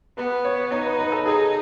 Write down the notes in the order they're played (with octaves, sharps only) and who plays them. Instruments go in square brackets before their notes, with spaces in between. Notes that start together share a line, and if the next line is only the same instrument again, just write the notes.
[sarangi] B3 [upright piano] B4
[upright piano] C#5
[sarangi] D#4 [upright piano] C#5
[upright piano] B4
B4
A4
[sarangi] D#4 [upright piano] G#4